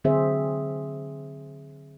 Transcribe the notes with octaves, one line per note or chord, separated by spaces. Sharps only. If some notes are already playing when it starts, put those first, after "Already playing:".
D3 F#3 C4 G#4 C5 E5